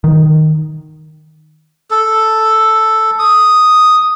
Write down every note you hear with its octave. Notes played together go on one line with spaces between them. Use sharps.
D#3
A4
D#6